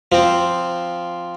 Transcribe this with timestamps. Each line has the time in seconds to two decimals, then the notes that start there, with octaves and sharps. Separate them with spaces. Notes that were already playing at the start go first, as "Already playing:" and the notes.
0.12 F3 C4